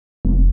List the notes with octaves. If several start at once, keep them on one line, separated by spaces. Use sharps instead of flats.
F1